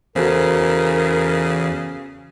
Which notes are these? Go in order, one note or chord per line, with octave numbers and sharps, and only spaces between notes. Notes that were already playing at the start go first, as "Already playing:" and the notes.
E2 C#3 F#4 A4 A#4 C5